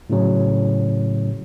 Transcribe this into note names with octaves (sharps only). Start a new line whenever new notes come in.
A2 C#3 F#3